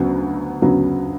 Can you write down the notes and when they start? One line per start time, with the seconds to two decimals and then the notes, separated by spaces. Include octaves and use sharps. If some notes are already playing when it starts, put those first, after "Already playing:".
Already playing: D2 C#3 F#3 B3
0.62 D2 C#3 F#3 B3